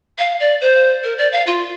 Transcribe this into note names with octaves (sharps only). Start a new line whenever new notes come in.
F5
D5
C5
A#4
D5
F5
F4